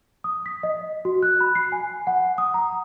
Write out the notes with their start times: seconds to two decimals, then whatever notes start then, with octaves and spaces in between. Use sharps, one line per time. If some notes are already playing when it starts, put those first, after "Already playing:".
0.24 D#6
0.46 B6
0.63 D#5
1.05 F#4
1.23 F#6
1.40 B5
1.55 C7
1.72 G#5
2.07 F#5
2.38 D#6
2.54 A#5